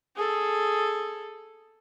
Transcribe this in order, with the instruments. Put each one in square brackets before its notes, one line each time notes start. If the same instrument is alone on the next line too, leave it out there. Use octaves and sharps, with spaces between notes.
[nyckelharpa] G#4 A4